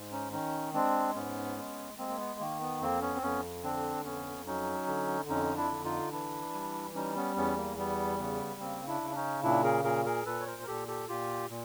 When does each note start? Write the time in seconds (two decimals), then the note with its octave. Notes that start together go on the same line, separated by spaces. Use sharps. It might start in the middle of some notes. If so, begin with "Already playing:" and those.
Already playing: G#2
0.12 C#4 D#4
0.32 D#3 C#4 D#4
0.74 G#3 C4 D4
1.15 G#2 B3 C#4
1.57 G#3
1.98 G#3 A#3 C4
2.09 A#3
2.19 B3
2.40 D#3 A#3
2.61 B3
2.81 F2 A#3 C4
3.01 B3 C#4
3.15 C4
3.22 F2 B3 C#4
3.63 D3 C4 D4
4.05 F2 B3 C#4
4.46 F#3 C#4 D#4
4.87 D3
5.29 F2 C#4 D#4
5.56 D4 E4
5.70 D3
5.84 D#4 F4
6.12 E3 D4 E4
6.53 G3
6.95 G3 C#4 D#4
7.16 B3 C#4
7.36 E2 B3 C#4
7.57 A#3
7.77 G3 B3
8.19 C#3 B3
8.60 C#3 A#3 C4
8.87 D4 E4
9.02 C#3
9.11 D4
9.15 C#4 D#4
9.43 A#2 D4 E4
9.64 G#4 A#4
9.84 A#2 G#4 A#4
10.05 G#4 A#4
10.26 A#2 A4 B4
10.40 C#5
10.47 A#4 C5
10.62 A#4
10.67 A#2 G4 A4
10.88 G4 A4
11.08 A#2 F4 G4
11.50 A#2